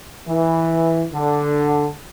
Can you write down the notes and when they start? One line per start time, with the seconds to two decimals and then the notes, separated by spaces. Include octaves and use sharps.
0.28 E3
1.13 D3